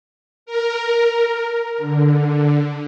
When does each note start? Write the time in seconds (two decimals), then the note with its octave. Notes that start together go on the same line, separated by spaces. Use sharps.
0.46 A#4
1.78 D3